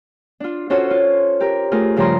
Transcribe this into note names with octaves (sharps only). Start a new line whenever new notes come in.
D4 F4
C#4 F4 F#4 A4 C5 C#5
F4
G4 A#4
A3 F4 G#4 A#4
G2 C#3 F3 G4 A#5 C6